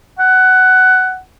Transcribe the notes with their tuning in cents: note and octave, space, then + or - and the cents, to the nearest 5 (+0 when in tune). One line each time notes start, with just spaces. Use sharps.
F#5 +15